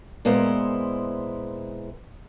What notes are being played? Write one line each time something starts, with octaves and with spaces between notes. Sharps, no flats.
A#2 G#3 B3 E4 A#4 C5